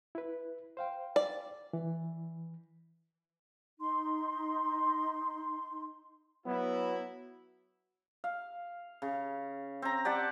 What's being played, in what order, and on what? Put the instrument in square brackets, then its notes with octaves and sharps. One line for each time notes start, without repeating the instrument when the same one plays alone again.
[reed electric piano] E4 B4
C5 F5 G5
[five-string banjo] D5
[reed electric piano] E3
[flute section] D#4 C6
[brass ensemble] F#3 E4 [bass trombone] B3
[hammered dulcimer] F5
C#3
C4 A#5
G4 D5 F#5 A5